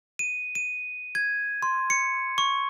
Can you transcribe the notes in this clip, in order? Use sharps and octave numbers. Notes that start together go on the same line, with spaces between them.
D#7
D#7
G#6
C6
C#7
C#6